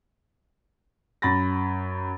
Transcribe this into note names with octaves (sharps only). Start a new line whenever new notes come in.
F#2 B5 A6 A#6